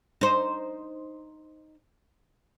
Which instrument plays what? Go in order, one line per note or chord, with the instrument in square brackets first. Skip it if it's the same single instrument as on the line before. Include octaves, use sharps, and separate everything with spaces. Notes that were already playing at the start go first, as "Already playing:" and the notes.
[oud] D#4 C5